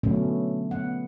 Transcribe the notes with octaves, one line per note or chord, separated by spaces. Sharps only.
B2 D3 F#3 A3 B3 C#4
B3 F#5